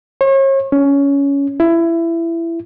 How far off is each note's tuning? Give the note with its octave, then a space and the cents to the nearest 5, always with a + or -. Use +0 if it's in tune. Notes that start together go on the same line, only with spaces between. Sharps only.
C#5 -40
C#4 +15
E4 +20